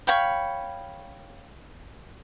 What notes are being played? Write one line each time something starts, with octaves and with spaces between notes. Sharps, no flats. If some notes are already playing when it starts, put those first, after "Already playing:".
C#5 F5 G5 B5